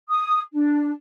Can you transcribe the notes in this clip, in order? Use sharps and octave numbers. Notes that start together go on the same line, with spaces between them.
D#6
D4